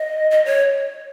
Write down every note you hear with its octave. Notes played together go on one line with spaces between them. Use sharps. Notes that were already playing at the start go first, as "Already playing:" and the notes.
Already playing: D#5
D#5
C#5